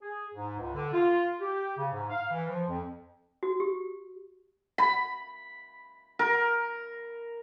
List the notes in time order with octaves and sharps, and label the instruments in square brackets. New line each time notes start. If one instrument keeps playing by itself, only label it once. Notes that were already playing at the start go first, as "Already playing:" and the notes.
[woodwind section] G#4
G#2
C#2
D3
F4
G4
C#3
G#2
F5
E3
F3
F2
[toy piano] F#4
G4
[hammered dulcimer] B5
A#4